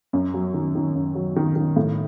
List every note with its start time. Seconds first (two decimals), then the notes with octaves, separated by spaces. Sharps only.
0.13 F#2
0.34 F#3
0.54 D#3
0.75 D#3
0.95 F#2
1.15 F#3
1.36 D#3
1.56 D#3
1.76 A2